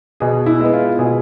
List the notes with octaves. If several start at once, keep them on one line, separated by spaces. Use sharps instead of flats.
B2 G#4
E4
G#3 B3
F4
B2 G#4